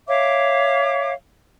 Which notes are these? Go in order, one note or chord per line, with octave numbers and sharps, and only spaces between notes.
C#5 E5 F5 D6